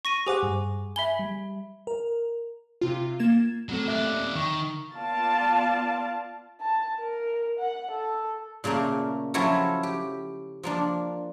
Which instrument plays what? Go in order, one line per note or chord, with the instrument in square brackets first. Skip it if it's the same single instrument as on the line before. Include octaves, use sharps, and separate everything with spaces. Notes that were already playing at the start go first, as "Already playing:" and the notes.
[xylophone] C#6 A#6 D#7
[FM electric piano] G4 C5 F#5 [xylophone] G#4 G#5 D6
[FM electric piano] G2
[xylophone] E5 B5 G7 [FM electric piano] G#5
[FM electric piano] G3
A#4
[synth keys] C3 F4
A#3 G#6 A6 E7
[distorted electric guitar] F#3 [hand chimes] A3 C4 A4
[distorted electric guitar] D#2 D5 [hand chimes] E5 D6 F#6
[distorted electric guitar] D#3 [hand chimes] C#6
[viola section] B3 F4 D5 F5 A5
[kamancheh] A5
A#4
F#5
A4
[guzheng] A#2 C#3 A3 A#3
F3 F#3 C#4 E4 A4
G4
F3 A#3 D4